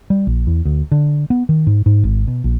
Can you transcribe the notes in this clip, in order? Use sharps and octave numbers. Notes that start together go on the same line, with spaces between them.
G3
A#1
E2
D2
D3
B3
D#3
G#2
G#2
G#1
B2
A#1